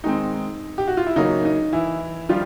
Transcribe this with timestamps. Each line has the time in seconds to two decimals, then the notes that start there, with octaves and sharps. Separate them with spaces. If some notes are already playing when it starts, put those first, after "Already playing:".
0.04 D#3 G#3 C4 D#4
0.78 G4
0.88 F#4
0.97 F4
1.07 E4
1.16 C#3 F#3 A#3 D#4
1.45 D#4
1.73 E3 E4
2.29 D#3 F3 G3 F4